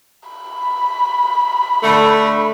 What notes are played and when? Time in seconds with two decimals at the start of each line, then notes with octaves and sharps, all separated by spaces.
0.29 B5
1.83 D3 A3